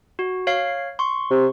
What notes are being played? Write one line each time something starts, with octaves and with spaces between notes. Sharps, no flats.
F#4
C#5 F5 C7
C6 C#6
C3